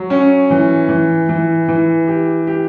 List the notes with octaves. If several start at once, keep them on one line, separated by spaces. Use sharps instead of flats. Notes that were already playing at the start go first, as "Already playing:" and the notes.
Already playing: F#3
C#4
E3
E3
E3
E3
G4
G4